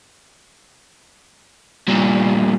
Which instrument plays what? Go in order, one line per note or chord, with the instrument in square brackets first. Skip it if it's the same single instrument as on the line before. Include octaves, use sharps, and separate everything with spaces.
[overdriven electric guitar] G2 A#2